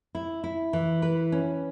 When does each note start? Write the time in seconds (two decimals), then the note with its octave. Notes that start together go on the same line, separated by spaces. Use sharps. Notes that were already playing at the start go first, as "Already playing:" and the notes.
0.15 E4
0.44 E4
0.73 E3
1.02 B4
1.32 C#4